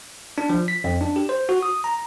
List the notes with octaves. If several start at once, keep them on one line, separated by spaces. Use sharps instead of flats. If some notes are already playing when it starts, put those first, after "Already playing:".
D4
F3
B6
F2
D4
G4
C5
F#4
D#6
A#5